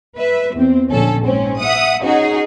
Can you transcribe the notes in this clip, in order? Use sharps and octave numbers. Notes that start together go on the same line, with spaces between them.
B4 E5
E2 C4
A#1 D3 C#4 A4
G#2 C4 C#4
E5 F#5 D#6
C#4 D#4 F#4 G#4